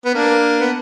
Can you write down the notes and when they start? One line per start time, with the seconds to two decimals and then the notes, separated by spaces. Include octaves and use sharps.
0.05 B3
0.14 A#3 D4
0.61 B3